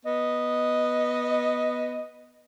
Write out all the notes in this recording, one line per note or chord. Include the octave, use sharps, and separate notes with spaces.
B3 D#5